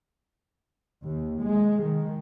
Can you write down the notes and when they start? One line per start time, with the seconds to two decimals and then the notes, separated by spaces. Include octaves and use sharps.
1.03 D#2
1.40 G#3
1.83 D#3